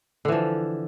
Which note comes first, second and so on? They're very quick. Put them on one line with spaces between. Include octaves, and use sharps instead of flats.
D3 E3 F3